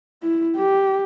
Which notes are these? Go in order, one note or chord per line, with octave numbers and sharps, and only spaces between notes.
E4
G4